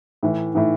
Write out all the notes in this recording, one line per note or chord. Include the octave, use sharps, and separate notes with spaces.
A2 E3
A2 E3